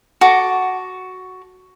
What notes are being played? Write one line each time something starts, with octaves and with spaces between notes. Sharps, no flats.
F#4 A4 D6